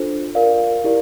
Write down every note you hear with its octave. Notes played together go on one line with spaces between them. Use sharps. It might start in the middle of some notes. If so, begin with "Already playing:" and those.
Already playing: D4 F4 A4 C5
F4 A#4 D5 F5
E4 G4 A#4 D5